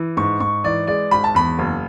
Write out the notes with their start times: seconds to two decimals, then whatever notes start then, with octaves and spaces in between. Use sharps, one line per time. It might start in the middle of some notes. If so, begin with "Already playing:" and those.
Already playing: E3
0.17 G#2 C#6
0.40 G#2 C#6
0.64 E3 D5
0.87 G#3 D5
1.11 G#1 B5
1.24 A5
1.35 E2 B5
1.59 F#1